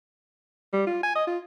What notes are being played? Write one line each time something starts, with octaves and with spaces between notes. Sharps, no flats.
G3
F4
G#5
D#5
F4